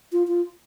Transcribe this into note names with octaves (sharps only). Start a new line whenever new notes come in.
F4
F4